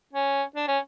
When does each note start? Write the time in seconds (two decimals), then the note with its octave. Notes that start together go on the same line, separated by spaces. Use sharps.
0.13 C#4
0.56 D4
0.67 C#4